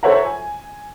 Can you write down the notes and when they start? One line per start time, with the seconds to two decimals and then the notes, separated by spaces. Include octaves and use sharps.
0.03 A4 C5 C#5 E5 F#5 A#5
0.25 G#5